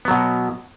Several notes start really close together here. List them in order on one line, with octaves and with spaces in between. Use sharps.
B3 F#3 B2